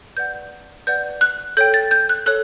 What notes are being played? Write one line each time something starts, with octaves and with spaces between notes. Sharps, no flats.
B4 D5 F#5 G6
B4 D5 F#5 G6
F#6
A4 C#5 G5 G6
A6
G6
F#6
A4 C#5 F#6